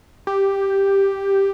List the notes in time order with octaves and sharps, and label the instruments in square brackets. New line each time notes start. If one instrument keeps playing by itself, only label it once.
[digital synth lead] G4